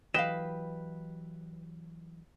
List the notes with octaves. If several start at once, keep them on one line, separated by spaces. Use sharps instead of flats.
E3 F#3 G4 B4 D#5 F5 G5 E7